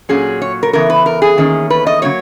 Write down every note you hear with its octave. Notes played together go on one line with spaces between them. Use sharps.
A#2 F#3 C#4 G#4
C#5
A#4
C#3 E3 B3 A#4
B4
A#4
G#4
E2 D#3 A#3 C#4
B4
D#5
C#3 F#3 A#3 C#5